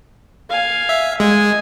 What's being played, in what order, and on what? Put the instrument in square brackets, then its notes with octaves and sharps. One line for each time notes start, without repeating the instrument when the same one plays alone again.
[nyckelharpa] F5 G#5
[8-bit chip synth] E5
[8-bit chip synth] G#3 [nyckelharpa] G#5